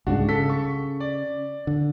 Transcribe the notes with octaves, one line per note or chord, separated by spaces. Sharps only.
C2 G#2 C#3 D4 F#4
C#3 A4 B6
C#6
D5
D3